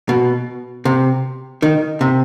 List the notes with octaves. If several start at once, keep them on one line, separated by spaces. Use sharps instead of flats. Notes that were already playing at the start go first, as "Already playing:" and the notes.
B2
C3
D#3
C3